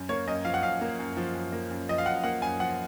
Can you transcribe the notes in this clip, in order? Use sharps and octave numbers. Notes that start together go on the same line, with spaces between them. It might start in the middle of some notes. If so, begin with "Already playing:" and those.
Already playing: F#2
A#3 C#5
F#2 D#5
F3 F5
F#5
F#2 F5
A#3
F#2
F3
F#2
A#3
F#2
F3 D#5
F5
F#2 F#5
A#3 F#5
F#2 G#5
F3 F#5